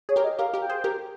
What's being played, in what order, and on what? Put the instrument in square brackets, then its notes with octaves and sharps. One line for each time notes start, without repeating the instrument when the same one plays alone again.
[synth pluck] G#4 [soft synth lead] C#5
[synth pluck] G4 A#4
[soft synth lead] D#5
[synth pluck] G4 A#4 [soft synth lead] F5
[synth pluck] G4 A#4
[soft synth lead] G5
[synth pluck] G#4 C5
G4 A#4